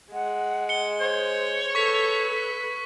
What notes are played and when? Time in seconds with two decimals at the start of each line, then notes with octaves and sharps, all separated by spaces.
0.13 G#3 F#5
0.69 C#7 G7
1.00 C5 C#5
1.75 A4 B4 C#6 B6